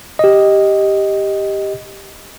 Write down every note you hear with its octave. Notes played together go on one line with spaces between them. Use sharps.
G4 D#5